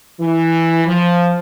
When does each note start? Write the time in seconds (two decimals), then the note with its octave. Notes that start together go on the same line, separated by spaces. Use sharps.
0.20 E3
0.85 F3